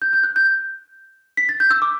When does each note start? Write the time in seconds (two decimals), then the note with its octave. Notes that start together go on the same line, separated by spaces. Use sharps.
0.02 G6
0.13 G6
0.23 F#6
0.36 G6
1.37 B6
1.49 A6
1.60 G6
1.71 E6
1.82 D6